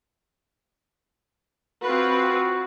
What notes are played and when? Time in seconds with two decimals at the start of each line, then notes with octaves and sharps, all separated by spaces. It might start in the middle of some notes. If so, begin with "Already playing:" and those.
1.82 C4 F4 F#4 B4